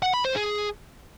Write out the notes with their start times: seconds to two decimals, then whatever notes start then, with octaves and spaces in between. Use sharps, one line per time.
0.02 F#5
0.14 B5
0.25 C5
0.36 G#4